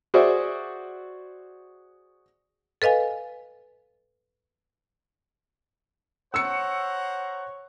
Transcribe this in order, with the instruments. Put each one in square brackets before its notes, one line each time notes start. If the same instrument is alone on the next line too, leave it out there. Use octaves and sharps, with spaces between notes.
[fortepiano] F#4 G#4 C5 D5 E5
[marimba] A4 B4 D#5 F5 G#5
[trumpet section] C5 F#5 A#5 [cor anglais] C#5 [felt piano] E6 C#7